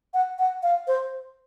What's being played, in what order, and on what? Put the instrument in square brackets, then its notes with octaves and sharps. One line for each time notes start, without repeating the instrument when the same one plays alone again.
[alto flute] F#5
F#5
F5
C5